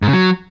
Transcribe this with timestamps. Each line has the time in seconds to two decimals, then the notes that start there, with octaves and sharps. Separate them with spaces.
0.02 G#2
0.08 C#3
0.13 F#3